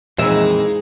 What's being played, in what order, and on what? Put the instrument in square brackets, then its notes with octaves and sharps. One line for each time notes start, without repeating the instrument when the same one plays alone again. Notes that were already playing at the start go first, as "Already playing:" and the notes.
[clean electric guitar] F2 [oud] A#2 E3 E5 [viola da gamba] G#3 D#4